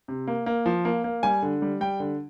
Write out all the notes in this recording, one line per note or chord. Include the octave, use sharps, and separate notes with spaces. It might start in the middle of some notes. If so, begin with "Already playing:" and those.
C3
A#3
A#3
F3
A#3
A#3
G3 G#5
D3
G3
G3 G5
D3